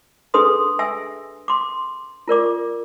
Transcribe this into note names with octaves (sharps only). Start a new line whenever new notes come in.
D4 G#4 A4 B4 C6 D#6
E5 G#5 E6
C6 D6
F4 A#4 D5 D6